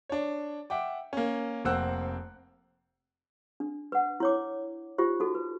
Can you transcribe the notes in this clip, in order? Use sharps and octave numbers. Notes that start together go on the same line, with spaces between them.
D4 C#5
E5 F#5 G5 D6
A#3 C#4
F1 A#3 C4 F#5 E6 F#6
D4
B4 F#5
E4 C#5 D6
D#4 F4 G4 C5
D#4 F#4 A4
B4